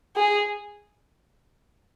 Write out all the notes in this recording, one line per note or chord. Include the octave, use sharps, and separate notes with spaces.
G#4